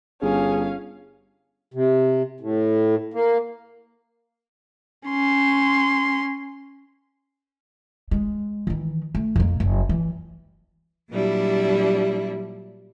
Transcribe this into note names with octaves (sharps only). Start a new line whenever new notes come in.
G1 C#4 G#4 F5
C3
A2
A#3
C#4 C6
G#3
D#3 E3
A3
F2 A#3
F#1
E3
A#2 F#3 G3 D4 E4